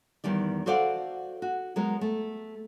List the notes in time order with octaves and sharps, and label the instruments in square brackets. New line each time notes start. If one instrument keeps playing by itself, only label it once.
[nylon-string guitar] E2 D#3 G3 D5
F#4 A4 C5 D5 F5 F#5
F#4
F#3 G#3 B3 A#4
A3